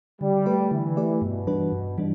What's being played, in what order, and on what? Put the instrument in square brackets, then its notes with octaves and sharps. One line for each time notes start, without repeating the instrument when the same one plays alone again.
[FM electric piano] D3 [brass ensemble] G3
[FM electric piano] A3 G4 B4 D5
[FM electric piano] D3 [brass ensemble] E3
[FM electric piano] A3 G4 B4 D5
[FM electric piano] G2 [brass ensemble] B2
[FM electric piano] E3 G3 D4 B4
G2
E3 G3 D4